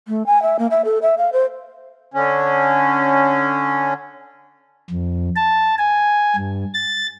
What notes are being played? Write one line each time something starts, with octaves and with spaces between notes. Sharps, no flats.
A3
G#5
E5
A#3
E5
A4
E5
F5
C5
D3 C#4
F2
A5
G#5
G2
A6